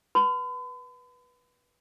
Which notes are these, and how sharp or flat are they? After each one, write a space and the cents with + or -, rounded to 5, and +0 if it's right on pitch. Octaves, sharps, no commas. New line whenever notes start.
B4 -15 B5 +45